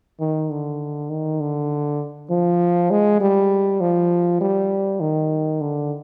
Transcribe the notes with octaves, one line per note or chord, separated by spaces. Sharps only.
D#3
D3
D#3
D3
F3
G#3
G3
F3
G3
D#3
D3